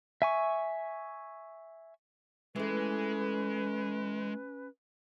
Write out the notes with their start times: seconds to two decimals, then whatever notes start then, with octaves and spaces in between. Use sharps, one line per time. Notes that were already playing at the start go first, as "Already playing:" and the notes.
0.22 E5 G#5 C#6
2.56 E3 G#3 A3 C#4 B4